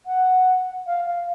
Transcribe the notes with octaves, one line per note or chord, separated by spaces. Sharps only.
F#5
F5
F5